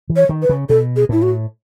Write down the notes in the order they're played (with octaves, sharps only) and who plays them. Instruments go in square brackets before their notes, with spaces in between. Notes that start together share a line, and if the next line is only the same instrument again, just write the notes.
[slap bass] E3
[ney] C#5
[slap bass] D#3
[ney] B4
[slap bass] C#3
[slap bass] B2 [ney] A4
[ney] G#4
[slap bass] A2 [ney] E4
[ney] F#4